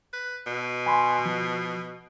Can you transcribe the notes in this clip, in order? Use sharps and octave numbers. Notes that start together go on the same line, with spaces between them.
B4
B2
G#5 B5 C6
F3